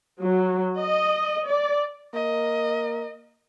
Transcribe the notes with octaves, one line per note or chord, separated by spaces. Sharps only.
F#3
D#5
D5
A#3 D#5